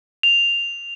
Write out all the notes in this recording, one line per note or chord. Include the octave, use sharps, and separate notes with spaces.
F7